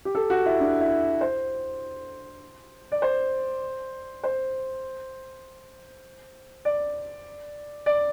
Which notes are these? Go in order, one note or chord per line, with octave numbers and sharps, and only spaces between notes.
G4
A4
F#4
E4
D4
E4
C5
D5
C5
C5
D5
D5